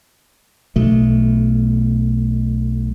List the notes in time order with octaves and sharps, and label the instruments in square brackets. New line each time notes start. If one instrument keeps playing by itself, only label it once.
[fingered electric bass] B1 B2 A3